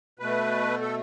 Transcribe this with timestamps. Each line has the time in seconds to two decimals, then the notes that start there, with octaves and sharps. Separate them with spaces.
0.19 B2 A3 B4
0.81 A4